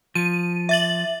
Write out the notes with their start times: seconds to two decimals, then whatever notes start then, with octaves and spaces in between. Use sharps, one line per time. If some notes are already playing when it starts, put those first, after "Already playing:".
0.15 F3 D#7
0.69 E5 A6 F#7